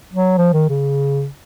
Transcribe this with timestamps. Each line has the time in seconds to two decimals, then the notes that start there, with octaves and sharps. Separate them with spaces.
0.13 F#3
0.38 F3
0.53 D#3
0.69 C#3